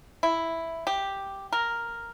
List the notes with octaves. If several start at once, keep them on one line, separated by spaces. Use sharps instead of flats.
E4
G4
A#4